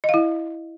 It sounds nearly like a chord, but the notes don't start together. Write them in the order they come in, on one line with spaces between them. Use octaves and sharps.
D#5 F5 E4